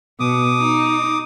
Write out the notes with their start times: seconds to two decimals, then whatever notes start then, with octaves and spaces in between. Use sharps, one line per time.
0.20 B2 D6 D#6
0.57 D#4